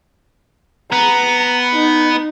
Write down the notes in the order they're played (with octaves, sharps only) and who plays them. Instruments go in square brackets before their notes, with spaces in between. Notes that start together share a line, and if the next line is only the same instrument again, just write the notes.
[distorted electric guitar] B3 [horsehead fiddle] A#5
[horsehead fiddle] D#4